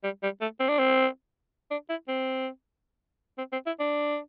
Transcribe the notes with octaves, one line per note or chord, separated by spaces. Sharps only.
G3
G3
A3
C4
D4
C4
D4
E4
C4
C4
C4
E4
D4